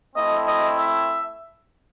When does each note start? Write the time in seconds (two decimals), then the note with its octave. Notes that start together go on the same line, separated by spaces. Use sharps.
0.16 A3 C4 E4 D#5
0.47 D#5
0.79 E5